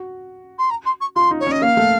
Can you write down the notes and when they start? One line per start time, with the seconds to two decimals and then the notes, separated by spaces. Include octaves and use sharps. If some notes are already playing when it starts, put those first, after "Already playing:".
Already playing: F#4
0.58 C6
0.70 A#5
0.85 C6
1.00 C#6
1.15 F4 C6
1.31 D#4
1.40 C#5
1.47 C#4 D#5
1.62 A#3 F5
1.77 A3